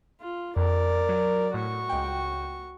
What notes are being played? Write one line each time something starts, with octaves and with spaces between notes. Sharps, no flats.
F4
F2 A#4 D5
F#3
A2 F#4 C#6
C#2 G5